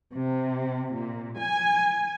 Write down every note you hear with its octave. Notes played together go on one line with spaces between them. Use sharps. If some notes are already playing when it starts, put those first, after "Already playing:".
C3
A#2
G#5